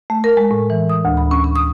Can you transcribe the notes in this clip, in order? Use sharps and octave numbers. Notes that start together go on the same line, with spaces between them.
A3
A#4
G#3
A2
E3
D#6
D2
B5
C#4
C#4
D#6